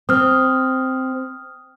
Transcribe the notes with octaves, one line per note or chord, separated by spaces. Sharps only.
C4 D#6 F6